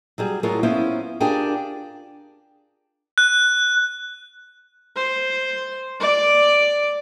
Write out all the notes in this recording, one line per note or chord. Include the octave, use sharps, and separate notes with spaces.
F#3 G3 G#4
A2 F#3 F4 G#4 A#4
B3 C#4 E4 F4 C5
D4 F4 G4 G#4 A#4 G5
F#6
C5
D5 D6